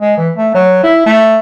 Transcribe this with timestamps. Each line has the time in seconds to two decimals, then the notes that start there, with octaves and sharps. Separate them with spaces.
0.01 G#3
0.18 E3
0.36 A3
0.54 F#3
0.83 E4
1.06 A3